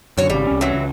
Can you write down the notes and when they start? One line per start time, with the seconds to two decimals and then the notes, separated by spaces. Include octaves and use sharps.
0.18 F#2 D3 F#4 C#5
0.30 G#1 C#3 G3
0.47 C2 C#4
0.61 E3 F#3
0.74 C#2